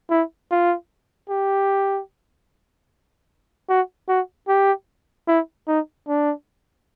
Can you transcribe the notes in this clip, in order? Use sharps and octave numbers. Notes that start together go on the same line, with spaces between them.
E4
F4
G4
F#4
F#4
G4
E4
D#4
D4